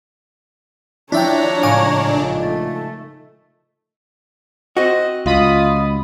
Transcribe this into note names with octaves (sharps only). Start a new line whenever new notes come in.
F3 D4 E4 C#5 E5 G5 A#5 A6
A2 C#3 G#3 F5 G#5 D6
A#1 D#4 A4
A3 A6
C4 F#4 D#5
C#2 F4 D#5 B5 D#6